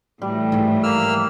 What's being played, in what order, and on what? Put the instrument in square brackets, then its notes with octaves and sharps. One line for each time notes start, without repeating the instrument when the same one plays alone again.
[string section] A2 E3 [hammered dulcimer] G3
[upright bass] G#2 F3
[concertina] A#3 E6 F6